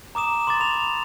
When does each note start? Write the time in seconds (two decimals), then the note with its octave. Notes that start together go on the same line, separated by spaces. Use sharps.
0.15 A#5 D6 D#6 E7
0.47 C6 D6 A6
0.60 B5 F7